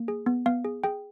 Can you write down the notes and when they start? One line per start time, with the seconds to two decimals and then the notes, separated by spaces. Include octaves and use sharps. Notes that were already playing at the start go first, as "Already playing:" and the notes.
Already playing: A#3
0.08 G#4
0.26 B3
0.46 B3 F5
0.65 G#4
0.84 G#4 G5